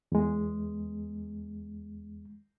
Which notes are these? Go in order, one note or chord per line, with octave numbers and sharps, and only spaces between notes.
E2 G#3